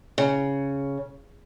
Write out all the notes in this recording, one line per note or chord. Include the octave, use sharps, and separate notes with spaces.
C#3